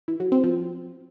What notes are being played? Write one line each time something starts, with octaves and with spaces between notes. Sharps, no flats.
E3
F#3
C4
F3